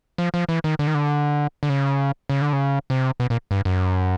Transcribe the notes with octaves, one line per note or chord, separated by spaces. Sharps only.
F3
F3
E3
D#3
D3
D#3
D3
D3
C#3
C#3
D3
C#3
C3
B2
A#2
G2
F#2